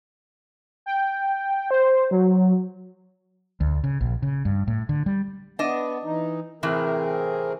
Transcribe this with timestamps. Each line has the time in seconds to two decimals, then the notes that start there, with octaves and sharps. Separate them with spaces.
0.86 G5
1.71 C5
2.11 F#3
3.60 D2
3.84 C#3
4.00 A#1
4.22 C#3
4.45 G2
4.67 A2
4.89 D3
5.06 G3
5.59 B3 D4 D#5
6.04 E3 D#4
6.63 A2 C3 E3 C4 G#4 A#4